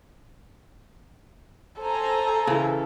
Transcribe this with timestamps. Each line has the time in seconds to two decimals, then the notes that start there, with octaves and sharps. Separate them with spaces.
1.82 A4 C5 G#5 A#5
2.47 C#3 E3